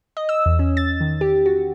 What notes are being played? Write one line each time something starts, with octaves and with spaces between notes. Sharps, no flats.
D#5
E6
E2
C#4
A6
D#3
G4
F#4